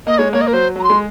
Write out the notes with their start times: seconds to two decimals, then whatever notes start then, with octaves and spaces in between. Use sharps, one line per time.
0.07 A#3 D#5
0.18 G#3 C#5
0.33 A#3 C#5
0.41 D#5
0.48 A#4
0.53 F#3 C5
0.76 F#3 A#5
0.84 C6
0.90 G#3